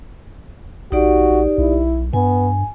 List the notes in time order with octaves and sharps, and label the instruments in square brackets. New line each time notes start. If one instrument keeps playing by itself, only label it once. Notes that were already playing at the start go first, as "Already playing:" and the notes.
[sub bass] A#1 [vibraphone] D#4 G4 D5 [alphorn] F#4
[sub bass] B1 [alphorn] E4
[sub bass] G2 [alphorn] B3 [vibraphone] G#5